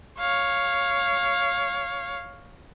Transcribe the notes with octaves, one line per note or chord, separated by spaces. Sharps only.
C#5 F5